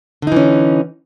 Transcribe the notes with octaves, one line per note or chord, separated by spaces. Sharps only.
D3 E3 C#4 D#4